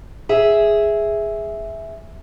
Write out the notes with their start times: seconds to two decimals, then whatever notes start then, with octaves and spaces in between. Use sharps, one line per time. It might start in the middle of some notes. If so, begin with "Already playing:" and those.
0.29 G#4 E5